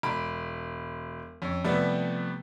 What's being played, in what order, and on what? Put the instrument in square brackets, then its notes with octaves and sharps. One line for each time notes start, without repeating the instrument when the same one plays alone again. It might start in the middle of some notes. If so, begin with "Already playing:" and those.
[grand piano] E1 B5 D7
F2 C#4
C3 F3 G3 A3 B3 B4